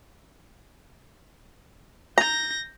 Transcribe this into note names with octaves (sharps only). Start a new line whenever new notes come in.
A#5 G6 A#6